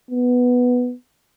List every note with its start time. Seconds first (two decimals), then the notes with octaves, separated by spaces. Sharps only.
0.11 B3